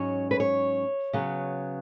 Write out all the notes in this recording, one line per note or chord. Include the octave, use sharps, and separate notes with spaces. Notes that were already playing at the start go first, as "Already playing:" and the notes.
Already playing: G#2 F#3 C#4 C#5
B4
C#5
C#3 F#3 B3